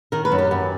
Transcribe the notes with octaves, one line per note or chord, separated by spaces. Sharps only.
D#3 A#4
B4
F#2
G4
F#2